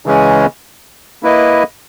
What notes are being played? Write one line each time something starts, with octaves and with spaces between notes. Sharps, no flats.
C#3 E3 G#3 C#4
A#3 E4 B4 D#5